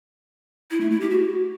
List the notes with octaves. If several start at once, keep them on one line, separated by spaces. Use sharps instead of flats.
E4
A3
E4
G4
F#4